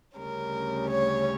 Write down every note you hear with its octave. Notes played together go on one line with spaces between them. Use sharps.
D2 C#3 G3 C#4 A#4
C#5